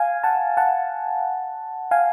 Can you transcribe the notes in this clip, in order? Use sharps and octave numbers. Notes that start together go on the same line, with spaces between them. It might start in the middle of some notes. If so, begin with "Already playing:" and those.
Already playing: F5 G#5
F#5 A5
F#5 A5
F5 G#5